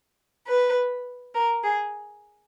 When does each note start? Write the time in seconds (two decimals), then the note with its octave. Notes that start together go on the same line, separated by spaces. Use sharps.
0.46 B4
1.34 A#4
1.64 G#4